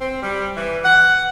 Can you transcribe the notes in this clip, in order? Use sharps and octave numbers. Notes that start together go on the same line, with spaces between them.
C4
G3
E3
F#5